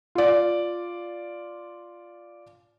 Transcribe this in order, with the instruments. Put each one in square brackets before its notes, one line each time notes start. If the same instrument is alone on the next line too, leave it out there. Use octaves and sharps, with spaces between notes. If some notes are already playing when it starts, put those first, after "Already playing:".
[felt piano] F4 D5